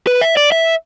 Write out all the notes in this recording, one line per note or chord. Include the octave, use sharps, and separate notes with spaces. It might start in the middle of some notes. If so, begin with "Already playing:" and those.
B4
E5
D5
E5